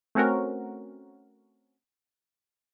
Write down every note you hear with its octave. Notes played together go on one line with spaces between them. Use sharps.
A3 C4 C#4 F#4 A#4